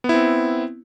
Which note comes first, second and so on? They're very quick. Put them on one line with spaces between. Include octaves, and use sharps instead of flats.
B3 E4 C4